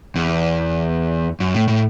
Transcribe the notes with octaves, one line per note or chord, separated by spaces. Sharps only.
E2
F#2
A2
A2